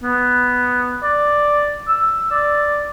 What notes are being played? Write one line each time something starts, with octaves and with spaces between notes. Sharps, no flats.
B3
D5
E6
D5